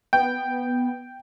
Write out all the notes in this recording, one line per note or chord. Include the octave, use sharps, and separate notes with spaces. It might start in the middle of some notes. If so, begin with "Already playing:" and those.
B3 G5